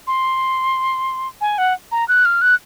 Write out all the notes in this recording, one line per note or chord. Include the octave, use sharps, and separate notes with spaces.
C6
G#5
F#5
A#5
F#6
F6
F#6